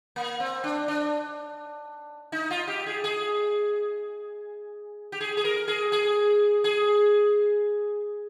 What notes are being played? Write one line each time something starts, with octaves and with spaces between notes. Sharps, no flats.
A#3
C4
D4
D4
D#4
F4
G4
G#4
G#4
G4
G#4
G#4
A#4
G#4
G#4
G#4